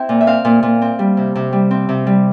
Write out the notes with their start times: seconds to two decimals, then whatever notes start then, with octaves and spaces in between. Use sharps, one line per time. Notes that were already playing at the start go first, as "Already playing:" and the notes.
Already playing: C4 E4 G5
0.09 A#2
0.21 E5
0.27 C4 F5
0.45 A#2
0.63 A#2
0.82 C4
0.99 G3
1.17 C3
1.35 C3
1.53 G3
1.71 C4
1.89 C3
2.07 G3